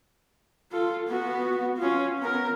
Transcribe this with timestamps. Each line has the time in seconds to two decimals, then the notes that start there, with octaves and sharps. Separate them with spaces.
0.72 F4 A4
1.08 B3 F#4
1.77 C#4 F4
2.19 B3 A#4